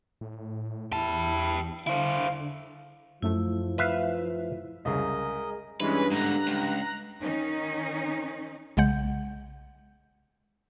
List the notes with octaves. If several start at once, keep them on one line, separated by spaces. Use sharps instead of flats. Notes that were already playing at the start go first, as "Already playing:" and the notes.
A2
E2 E4 G4 A5
D3 E4 C5 F5
F#2 F3 A3 E4
B4 E5 F5
C2 C#3 G#3 G#4 A#4 D#5
G2 E3 G#3 C#4 B4
G#2 D3 A#5 F#6 A#6
C#2
D#3 C#4 D#4
B1 C#3 G#3 F#5 G6